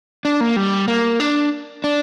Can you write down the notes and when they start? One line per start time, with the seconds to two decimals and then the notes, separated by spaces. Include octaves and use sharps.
0.25 D4
0.41 A#3
0.56 G3
0.88 A#3
1.20 D4
1.84 D4